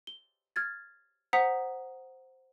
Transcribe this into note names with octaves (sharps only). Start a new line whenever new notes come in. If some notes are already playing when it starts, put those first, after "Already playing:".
G7
F6 G#6 A6
C5 F#5 A#5 D#6 B6